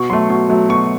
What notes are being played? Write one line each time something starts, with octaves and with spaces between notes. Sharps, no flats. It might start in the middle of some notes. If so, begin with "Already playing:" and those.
Already playing: B2 C#6
F#3 A3 C6
B2 C#6
F#3 A3
B2 C#6